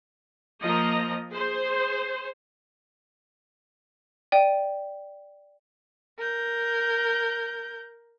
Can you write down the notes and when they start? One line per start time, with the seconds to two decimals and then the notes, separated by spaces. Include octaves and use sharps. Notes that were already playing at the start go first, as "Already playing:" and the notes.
0.63 F3 A#3 D#5 A#5
1.31 G#4 C5
4.32 D5 G5 D#7
6.18 A#4 G6